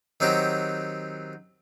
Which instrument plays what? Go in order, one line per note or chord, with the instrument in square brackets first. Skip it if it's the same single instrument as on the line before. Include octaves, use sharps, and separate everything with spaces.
[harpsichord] D#3 F#3 C4 F#4 G4